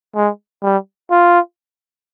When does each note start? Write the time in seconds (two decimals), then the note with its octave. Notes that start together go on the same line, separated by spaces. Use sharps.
0.15 G#3
0.63 G3
1.11 F4